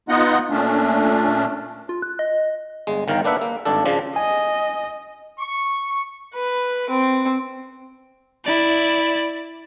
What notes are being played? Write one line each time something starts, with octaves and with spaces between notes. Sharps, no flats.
B3 D#4 F4 D#5 F#5
A#2 A3 C#4 D4
F4
F#6
D#5
G1 G#3
G1 D#3 F5 G5 A#5
A#3 D4 B4 E5 F#5
A#3
G#1 G2 D4 A4
C#3 F3 D4
D#5 G#5
C#6
B4
C4
E4 D5